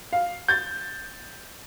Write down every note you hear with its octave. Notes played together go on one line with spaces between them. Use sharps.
F5
G6 A6